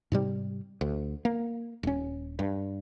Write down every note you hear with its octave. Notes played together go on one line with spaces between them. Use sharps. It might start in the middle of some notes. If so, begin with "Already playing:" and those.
G#2 C3 G3
D2
A#3
D#1 C#4
G2